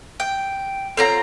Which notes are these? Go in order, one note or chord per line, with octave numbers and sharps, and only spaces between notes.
G5
C4 F4 A4 C#5 F#5 A#5